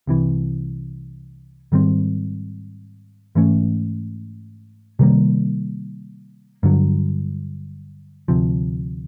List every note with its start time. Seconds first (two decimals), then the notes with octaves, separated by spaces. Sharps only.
0.07 C2 C3 E3
1.72 G#2 D#3 G3 C4
3.35 G#2 E3 A3 C#4
4.99 C3 D#3 G3 A#3
6.63 G2 D3 F#3
8.28 D2 C3 F3